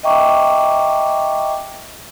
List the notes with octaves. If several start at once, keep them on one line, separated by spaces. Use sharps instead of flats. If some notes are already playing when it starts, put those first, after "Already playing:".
D#5 E5 G5 A#5 C#6 D6